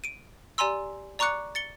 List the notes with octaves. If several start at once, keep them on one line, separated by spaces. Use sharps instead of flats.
D7 D#7
G4 D5 G#5 A#5 C6 E6
D5 A#5 C#6 D6 F#6 C#7
A6 C#7 G7